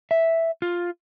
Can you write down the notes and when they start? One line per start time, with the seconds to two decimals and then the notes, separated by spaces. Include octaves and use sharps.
0.11 E5
0.62 F4